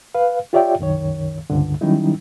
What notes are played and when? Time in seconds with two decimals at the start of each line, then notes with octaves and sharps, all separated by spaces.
0.15 B4 F5
0.53 F4 G4 C#5 D5 E5 G5
0.79 C2 F#2 D#3 C#5
1.50 C#2 G2 D3
1.81 D#3 F#3 G3 C#4 D#4 E4